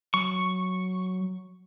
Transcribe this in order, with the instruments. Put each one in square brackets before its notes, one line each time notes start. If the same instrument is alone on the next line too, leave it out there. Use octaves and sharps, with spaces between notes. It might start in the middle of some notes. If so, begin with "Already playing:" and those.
[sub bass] F#3 [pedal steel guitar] C#6